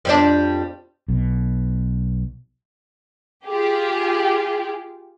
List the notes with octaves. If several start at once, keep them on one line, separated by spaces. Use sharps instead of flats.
F2 G3 D4
B1 B2
F4 G4 G#4